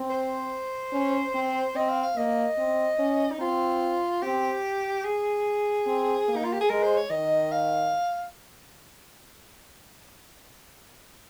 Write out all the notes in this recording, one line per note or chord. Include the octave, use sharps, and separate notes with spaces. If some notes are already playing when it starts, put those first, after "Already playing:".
Already playing: C4
C5
C#4
C4
C4 D#5
F5
F5
A#3 D#5
C4
C#4
D#4
C4 F4
C4 G4
G#4
C4
A#3
D#4
F4
G4
G#4
G#3 A#4
C5
C#5
D#3 D#5
F5